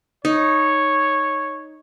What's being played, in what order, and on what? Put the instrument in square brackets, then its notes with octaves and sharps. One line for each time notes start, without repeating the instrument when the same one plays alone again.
[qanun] D#4 [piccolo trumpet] C#5